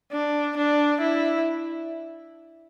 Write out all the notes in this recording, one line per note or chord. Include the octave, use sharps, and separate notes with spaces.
D4
D4
E4